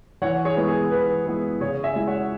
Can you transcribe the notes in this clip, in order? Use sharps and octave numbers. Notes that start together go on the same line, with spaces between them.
E3 C#5 F#5
G#4 C#5
G#3 B3 E4
G#4
E3 B4
G#3 B3 E4
C#3 G#4 C#5
E5 G#5
G#3 E4
C#5 F#5